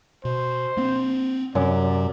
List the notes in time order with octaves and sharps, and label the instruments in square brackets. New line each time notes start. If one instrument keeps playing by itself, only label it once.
[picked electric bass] B2 [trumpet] C5
[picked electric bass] A#3 C4
[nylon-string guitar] F#2 [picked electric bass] C3 [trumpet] D5